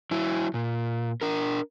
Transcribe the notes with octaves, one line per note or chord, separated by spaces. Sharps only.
F#3 E4
A#2
D4 A#4